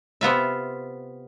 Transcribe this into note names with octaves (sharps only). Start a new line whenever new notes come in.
C3 B3 F4 E5